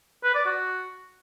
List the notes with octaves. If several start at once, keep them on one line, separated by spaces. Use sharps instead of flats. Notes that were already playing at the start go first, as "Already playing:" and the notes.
B4
D5
F#4